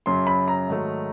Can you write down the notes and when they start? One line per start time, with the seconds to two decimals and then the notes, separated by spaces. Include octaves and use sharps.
0.06 F#2 C#3 F#3 C6
0.27 B5
0.48 A#5
0.68 G#2 D#3 F#3 A3